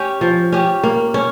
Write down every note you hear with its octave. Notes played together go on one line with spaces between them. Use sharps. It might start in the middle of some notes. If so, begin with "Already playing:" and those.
Already playing: C#4 G4
F3
C#4 G4
A#3
C#4